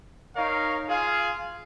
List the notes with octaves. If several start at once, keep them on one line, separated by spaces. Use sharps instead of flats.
D#4 A#4 C#5 F5
F4 G#4 F5